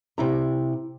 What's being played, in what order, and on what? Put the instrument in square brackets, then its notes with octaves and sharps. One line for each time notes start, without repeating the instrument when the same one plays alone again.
[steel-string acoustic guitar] C3 E4 A#5